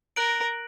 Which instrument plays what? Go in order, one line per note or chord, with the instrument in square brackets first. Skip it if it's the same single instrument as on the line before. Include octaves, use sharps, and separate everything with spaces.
[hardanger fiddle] A#4 [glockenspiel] F#6 A#6 D7 F#7